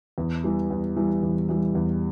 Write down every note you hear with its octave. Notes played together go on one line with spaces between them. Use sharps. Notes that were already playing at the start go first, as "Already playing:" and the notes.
E2
E3 G3
E2
E3 G3
E2
E3 G3
E2